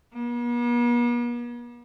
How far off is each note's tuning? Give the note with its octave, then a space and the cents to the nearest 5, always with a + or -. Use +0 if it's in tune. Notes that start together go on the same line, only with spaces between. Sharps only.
B3 -45